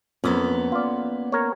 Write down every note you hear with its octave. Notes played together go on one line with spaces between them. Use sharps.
F2 A#3 B3 C#4
F4 D5
A#4 C#5